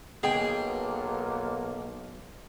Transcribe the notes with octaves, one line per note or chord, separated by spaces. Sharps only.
B1 B2 A#3 G#4 G5